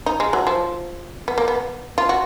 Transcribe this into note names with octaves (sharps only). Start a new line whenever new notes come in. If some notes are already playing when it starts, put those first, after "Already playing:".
D#4
G#3
F#3
F3
B3
A#3
B3
F4
F#4